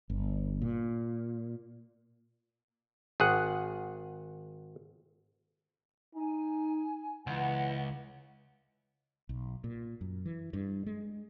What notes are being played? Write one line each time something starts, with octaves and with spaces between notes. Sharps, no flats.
G1
A#2
G#1 G#4 F#5
D#4 G#5
C#2 E3 F#5
B1
A#2
F#2
E3
G2
G#3